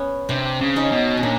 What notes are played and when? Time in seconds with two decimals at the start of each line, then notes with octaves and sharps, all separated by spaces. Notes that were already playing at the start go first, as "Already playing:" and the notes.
Already playing: B3 C#4
0.29 C3 C4 D4
0.61 C#3
0.76 C#4 D#4
0.92 B2
1.17 C#4
1.23 A#2 D4